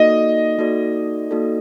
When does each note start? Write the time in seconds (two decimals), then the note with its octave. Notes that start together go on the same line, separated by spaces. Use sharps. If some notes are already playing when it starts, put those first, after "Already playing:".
Already playing: A#3 D#4 F#4 A4 D5 D#5
0.58 A#3 D#4 F#4 A4 D5
1.31 A#3 D#4 F#4 A4 D5